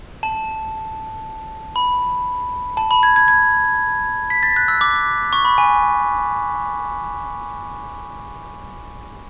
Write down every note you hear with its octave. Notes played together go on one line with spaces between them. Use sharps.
A5
B5
A5
B5
G#6
G#6
G#6
B6
A6
F#6
E6
D6
C#6
B5
G#5